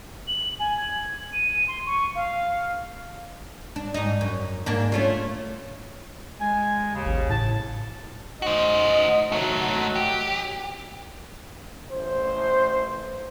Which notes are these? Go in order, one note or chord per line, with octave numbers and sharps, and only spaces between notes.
F#7
G#5
G#6
D#7
C6
C#6
F5
D4
G#2 D#4
F#2
G#2 A#3 D4
A3 C#4 F4
G#3 G#5
D#2 C#3
A1
A2 A5
D#4 F#4 C5
F#3 A3 D#4
G4
A1 C5